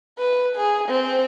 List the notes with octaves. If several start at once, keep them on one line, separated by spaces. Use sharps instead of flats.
B4
G#4
C4